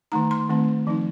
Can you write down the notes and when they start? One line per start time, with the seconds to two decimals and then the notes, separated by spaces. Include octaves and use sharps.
0.12 D#3 A3 D#4 A#5
0.31 C6
0.49 D#3 A3 C4
0.87 F3 C4 D#4